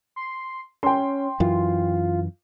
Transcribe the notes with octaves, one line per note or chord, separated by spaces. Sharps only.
C6
C#4 G5 C6
F#2 E3 F4